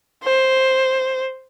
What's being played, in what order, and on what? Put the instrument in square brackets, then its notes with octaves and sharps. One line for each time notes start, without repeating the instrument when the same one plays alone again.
[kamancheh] C5